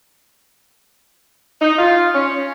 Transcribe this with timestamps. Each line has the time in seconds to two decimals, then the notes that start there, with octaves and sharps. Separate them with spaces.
1.62 D#4
1.78 F4
2.15 C#4